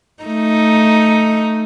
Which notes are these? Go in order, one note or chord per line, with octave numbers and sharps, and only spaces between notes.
A3 D#4